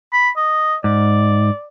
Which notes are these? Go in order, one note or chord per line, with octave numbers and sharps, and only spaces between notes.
B5
D#5
G#2 D5